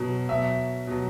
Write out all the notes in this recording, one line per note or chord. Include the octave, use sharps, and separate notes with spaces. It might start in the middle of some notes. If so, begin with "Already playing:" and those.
Already playing: B2 F#3
B2 F#3 E5
B2 F#3